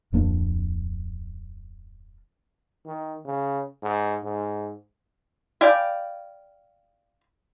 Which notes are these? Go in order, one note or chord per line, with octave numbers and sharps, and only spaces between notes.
D1 F2 A#3 D4
D#3
C#3
G#2
G#2
D5 F5 G5 G#5 B5